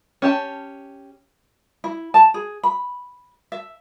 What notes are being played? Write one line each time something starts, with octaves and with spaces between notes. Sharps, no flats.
C#4 G4 A5
E4
A5
G#4
B5
E5